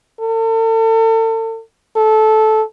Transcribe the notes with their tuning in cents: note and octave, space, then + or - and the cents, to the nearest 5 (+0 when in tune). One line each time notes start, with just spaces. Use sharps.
A4 +40
A4 -15